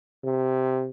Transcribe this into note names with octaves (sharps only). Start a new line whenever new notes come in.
C3